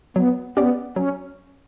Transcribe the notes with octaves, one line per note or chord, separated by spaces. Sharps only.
F#3 B3
B3 C#4 G4 D5
F#3 C#4